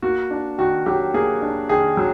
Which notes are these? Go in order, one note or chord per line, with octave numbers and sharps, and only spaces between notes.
A#3 F#4
D4
D#3 F#4
F#3 G4
A#3 G#4
D4
D#3 G#4
F#3